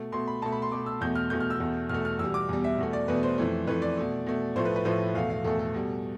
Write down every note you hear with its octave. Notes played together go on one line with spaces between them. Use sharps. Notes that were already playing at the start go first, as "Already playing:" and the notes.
Already playing: B2 A3
B2 A3 C6
B5
B2 A3 A5
B5
C6
B2 A3 D6
E6
E2 B2 A3 G6
F6
E2 B2 A3 G6
F6
E6
E2 B2 A3
E2 B2 A3 F6
F6
E2 B2 G3 E6
D6
E2 B2 G3
E5
E2 B2 A3
D5
E2 B2 A3 B4
C5
F2 E3 A3
F2 E3 A3 B4
D5
B2 A3
B2 A3
A2 F3 A3 C5
B4
B4
A2 F3 A3 C5
E2 B2 A3 F5
F5
E2 B2 A3 A4
A4
B2 G3